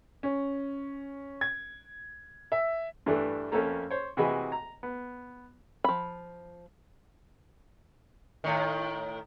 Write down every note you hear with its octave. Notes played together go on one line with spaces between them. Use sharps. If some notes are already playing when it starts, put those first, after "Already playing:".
C#4
G#6
E5
G2 E3 A3 D4
F2 A3 A#3 C#4 A4 A#5
C5 C#5
C3 E3 F#4 G#4 D#5 B5
A#5
B3
F3 B5
A2 D#3